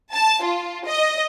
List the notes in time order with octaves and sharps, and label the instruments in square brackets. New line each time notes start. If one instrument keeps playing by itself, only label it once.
[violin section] A5
F4
D#5